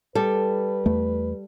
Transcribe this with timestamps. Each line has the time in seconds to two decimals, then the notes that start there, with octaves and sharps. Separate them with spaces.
0.15 G3 A4 B4
0.86 E2 A3